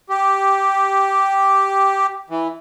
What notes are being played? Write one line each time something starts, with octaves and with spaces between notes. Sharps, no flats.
G4
E3